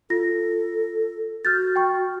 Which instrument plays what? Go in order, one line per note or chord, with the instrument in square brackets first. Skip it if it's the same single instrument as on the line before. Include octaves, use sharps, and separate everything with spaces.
[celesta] F4 A#6 [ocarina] A4
[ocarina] F#4 [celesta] F6 G6 A6
[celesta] G5 C#6